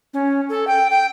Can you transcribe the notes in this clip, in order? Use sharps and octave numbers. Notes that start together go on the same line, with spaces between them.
C#4
A4
G5
G5